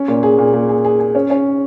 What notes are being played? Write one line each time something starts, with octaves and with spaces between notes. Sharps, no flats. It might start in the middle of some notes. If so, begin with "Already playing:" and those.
Already playing: C#4
A#2
G#4
A#2
A#2
G#4
G#4
G#4
C#4
C#4